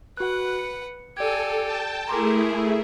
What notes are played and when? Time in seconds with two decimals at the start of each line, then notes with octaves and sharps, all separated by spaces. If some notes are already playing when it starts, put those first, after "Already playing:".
0.17 F#4 B4 F#5 F#6
0.59 C#7
1.17 G4 A4 D5 G#5 G#6
1.64 G5 A5
2.08 A3 E4 G#4 A#4 A#5 C6 D6